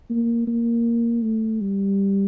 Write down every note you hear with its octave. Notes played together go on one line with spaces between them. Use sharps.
A#3
A#3
A3
G3